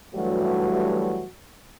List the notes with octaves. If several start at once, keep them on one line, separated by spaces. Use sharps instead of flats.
G2 E3 F#3 G3 A3 F#4